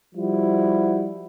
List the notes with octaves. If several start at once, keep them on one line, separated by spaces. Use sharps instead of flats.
F3 G3 E4 F#4